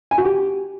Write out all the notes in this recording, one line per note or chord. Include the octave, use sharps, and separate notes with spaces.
G#5
F#4
G4